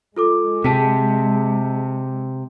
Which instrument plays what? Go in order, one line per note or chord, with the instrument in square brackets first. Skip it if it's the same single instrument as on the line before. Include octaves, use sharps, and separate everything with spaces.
[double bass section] G#3 [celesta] F4 A4 D6
[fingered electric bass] C3 [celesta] G#4 A5 B6